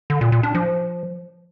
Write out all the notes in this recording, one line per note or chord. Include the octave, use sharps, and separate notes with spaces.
D3
A#2
A#2
D4
F3